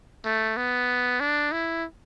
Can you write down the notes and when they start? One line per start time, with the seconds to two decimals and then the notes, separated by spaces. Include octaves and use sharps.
0.25 A3
0.57 B3
1.20 D4
1.52 E4